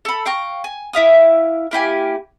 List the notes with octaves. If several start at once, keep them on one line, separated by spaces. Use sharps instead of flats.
A4 B5
F5 G5 A#5 C#6
G#5
E4 E5 F5 D#6
A#3 E4 G4 G#5